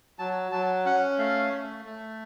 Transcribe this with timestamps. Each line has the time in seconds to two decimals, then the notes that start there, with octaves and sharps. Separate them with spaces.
0.19 F#3 A5
0.52 F#3 A5
0.85 C#4 F#5
1.18 A3 F5
1.52 A3
1.85 A3